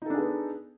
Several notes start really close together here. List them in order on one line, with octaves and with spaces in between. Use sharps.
D#4 A4 D4 G#4 B3